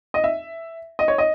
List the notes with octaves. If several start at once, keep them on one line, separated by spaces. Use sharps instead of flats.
D#5
E5
D#5
C#5
D#5